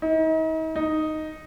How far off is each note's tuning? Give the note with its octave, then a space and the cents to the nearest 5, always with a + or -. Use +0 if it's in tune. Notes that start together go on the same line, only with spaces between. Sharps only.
D#4 +40
D#4 +0